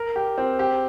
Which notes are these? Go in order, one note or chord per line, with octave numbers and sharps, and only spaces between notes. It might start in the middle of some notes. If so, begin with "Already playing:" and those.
Already playing: A#4
G4
C4
G4